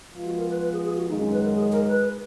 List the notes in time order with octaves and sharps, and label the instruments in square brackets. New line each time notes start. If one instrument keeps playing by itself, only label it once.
[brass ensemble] F3 G#3 B3 F4
[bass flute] F#4
A#4
B4
B4
G#4
G#4
F#4
[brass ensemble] F#2 D#3 G#3 [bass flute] D#4
[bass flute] C#4
B4
A#4
G#4
A#4
B4